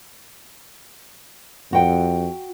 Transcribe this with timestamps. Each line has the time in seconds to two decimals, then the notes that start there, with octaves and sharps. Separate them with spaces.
1.73 F2 F#4 G5